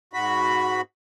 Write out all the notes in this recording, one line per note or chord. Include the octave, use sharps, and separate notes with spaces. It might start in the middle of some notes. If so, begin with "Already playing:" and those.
G#2 F#4 B5